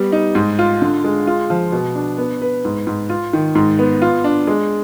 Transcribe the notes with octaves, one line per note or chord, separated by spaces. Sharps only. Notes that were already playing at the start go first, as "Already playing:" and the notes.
Already playing: G3 B3
D#4
G#2
F4
D3
G#3
F4
F3
B2
D4
B3
B4
G#2
G#2
F4
D#3
G#2
B3
F4
D4
G#3